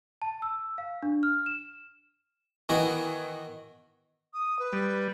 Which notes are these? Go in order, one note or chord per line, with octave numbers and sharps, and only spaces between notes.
A5
E6
F5
D4
F6
E7
D#3 E3 B3 F#4
D#6
B4
G3